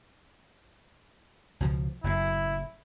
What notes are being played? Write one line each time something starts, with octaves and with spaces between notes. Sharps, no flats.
C#2 B2 F3
F#1 F#2 A2 E4